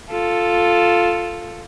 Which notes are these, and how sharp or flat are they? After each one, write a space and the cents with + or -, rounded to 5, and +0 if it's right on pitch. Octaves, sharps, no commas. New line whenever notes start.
F4 +0 A4 +0